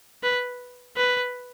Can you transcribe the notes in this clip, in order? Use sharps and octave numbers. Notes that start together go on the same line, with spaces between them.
B4
B4